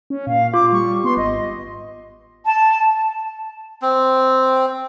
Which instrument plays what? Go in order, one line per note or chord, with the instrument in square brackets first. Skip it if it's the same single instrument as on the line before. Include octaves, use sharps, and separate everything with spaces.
[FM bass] C#4
[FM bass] A#2 [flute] F5
[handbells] F4 [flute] D6
[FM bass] G3 [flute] C#6
[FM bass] B3 [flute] C6
[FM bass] G#1 [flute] D#5
[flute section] A5
[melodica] C4